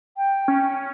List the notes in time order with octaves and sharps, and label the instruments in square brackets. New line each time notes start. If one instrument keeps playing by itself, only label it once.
[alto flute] G5
[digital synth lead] C#4